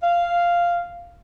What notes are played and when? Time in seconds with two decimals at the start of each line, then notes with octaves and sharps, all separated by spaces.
0.02 F5